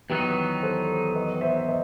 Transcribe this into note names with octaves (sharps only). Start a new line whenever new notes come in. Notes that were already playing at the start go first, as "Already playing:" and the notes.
E2 D#3 F#3 B3 D#4 G4 B4
A4 C5
B4 D#5
C5 E5
E5
B4 D#5